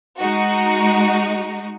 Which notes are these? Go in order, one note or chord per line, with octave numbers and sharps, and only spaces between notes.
G#3 D#4 F#4